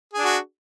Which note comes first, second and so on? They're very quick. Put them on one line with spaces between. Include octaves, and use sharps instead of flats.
G#4 D4 F#4